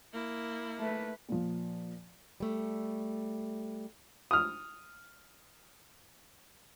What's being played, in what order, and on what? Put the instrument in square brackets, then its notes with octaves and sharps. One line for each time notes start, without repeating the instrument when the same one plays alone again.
[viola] A#3 E4
[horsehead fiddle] A3 B4
[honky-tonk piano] A#2 F3
[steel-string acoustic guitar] G3 A3
[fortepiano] D#6 F6